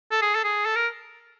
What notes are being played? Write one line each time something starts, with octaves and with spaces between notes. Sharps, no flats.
A4
G#4
A4
G#4
A4
A#4